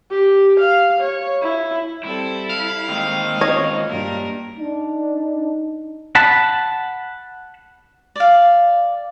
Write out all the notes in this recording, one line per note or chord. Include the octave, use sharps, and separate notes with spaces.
G4
F5
C#5
E4
G3 C4 E4 A4
F5
D#3 G#3 A#3 C4
C#4 F4 C#5 D#5
G2 A#3 A#4
D4 D#4
F#5 A5 B5
D5 F5